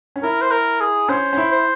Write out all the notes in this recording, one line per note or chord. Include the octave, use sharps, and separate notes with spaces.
C#4
E4 A#4
C5
A#4
G#4
C#4 C5
C#4
E4
C5